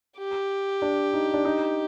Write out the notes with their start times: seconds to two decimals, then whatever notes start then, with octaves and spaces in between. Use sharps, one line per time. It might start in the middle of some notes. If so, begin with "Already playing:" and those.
0.19 G4
0.82 D4
1.13 D#4
1.34 D4
1.45 D#4